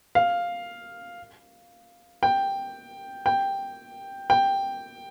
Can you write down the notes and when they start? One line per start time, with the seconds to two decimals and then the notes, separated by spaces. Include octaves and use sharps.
0.15 F5
2.23 G5
3.26 G5
4.30 G5